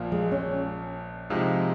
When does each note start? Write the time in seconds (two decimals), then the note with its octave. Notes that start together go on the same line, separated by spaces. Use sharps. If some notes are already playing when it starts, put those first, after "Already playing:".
Already playing: A#1 A#2 F3
0.12 G#3
0.32 C#4
1.30 C3 F3 G#3 D#4